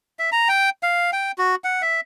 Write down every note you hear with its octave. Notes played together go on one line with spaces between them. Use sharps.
E5
A#5
G5
F5
G5
F#4
F#5
E5